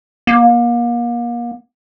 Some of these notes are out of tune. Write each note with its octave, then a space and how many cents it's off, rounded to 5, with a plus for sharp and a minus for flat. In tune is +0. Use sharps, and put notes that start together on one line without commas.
A#3 +35